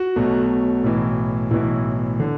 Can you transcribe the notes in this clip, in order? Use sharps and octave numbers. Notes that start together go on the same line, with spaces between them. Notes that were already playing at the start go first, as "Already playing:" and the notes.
Already playing: F#4
B1 B2 F#3 A3
B1 A2 E3
B1 A2 E3 E4
D3